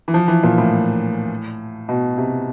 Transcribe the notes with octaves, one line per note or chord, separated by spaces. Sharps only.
E3
F3
E3
A#2
A2
B2
C3